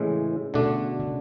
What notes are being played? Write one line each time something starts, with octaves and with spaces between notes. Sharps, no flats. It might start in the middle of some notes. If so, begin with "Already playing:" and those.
Already playing: A2 C#3 E3 G#3
B2 D3 A3 D4
C#3